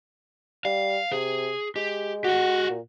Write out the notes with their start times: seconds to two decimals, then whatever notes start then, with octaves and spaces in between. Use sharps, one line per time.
0.65 G3 F5
1.12 C3 G#4
1.76 G#3 G4
2.24 F#4 G4 F#5
2.70 A#2